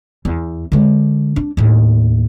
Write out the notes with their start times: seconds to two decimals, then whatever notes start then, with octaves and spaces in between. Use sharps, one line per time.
0.25 E2
0.72 D3 G#3
1.36 D4
1.57 D#2 A2